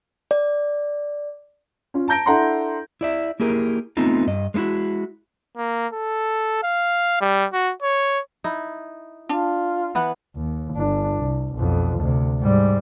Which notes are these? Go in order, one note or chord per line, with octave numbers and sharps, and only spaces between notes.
D5
C#4 F4
A5 A#5 G6 A#6 D7
D4 E4 A4 F#5 A#5 C6
E4 D5 E5
A#3 E4 G4 G#4 A#4
A3 B3 C4 D#4 F4
G2 D#5
G#3 B3 D#4 E4 F#4
A#3
A4
F5
G3
F#4
C#5
D#4 E4
D4 F4
E3 B3 F#5
D#2
G1 D4
C2
B1 F2
D2 C3
G#2 G3